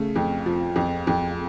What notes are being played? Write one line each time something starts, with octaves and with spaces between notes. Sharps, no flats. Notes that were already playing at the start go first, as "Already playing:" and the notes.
Already playing: C#3 A3
F2
F3
F2
F2